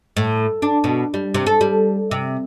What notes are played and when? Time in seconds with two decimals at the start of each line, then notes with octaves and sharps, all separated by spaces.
0.17 A2
0.62 D4
0.84 B2
1.14 G3
1.34 C3
1.46 A4
1.61 G3
2.11 C3